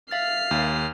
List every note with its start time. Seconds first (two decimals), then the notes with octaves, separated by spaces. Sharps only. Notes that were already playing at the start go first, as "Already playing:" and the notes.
0.11 E5 F5 F6 A6 C7
0.51 D#2